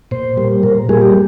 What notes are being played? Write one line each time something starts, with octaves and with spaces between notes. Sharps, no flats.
A#2 C5
G3 A#3
A#2 A#4
G3 A#3 G#4
G4